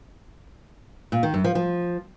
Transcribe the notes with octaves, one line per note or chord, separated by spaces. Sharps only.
A#2
D#3
F#2
F3
F3